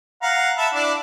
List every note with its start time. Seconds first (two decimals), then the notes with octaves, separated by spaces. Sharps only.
0.22 F5 F#5 A#5
0.58 E5 A5 B5
0.74 D4 E4 D5